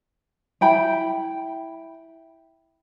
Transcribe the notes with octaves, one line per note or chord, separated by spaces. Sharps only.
E4 G5 B5